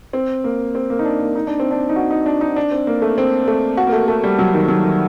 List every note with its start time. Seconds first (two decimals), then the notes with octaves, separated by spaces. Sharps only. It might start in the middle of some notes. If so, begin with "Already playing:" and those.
0.13 C4
0.44 A#3
0.75 C4
0.90 A#3
0.99 D#4
1.05 D4
1.20 A#3
1.35 D#4
1.47 D4
1.60 C4
1.71 D4
1.89 D#4
1.96 F#4
2.11 D#4
2.26 D4
2.41 D#4
2.56 D4
2.72 C4
2.87 A#3
3.02 A3
3.18 C4
3.48 A3
3.77 F#4
3.87 A#3
3.92 A3
4.08 A3
4.23 G3
4.39 F#3
4.54 D#3
4.68 F#3
4.84 D#3